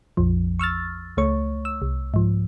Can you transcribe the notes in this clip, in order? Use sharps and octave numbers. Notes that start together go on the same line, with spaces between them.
A#1 F2 F3
C#6 E6 F6 A6
C#2 A3 C#5 C#6
E6
C2
G#2 F3